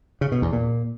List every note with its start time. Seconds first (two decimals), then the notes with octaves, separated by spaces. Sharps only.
0.21 C#3
0.32 B2
0.42 E2
0.53 A#2